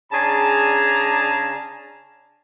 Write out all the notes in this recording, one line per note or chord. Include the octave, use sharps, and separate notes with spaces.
C#3 D4 G#4 A5 A#5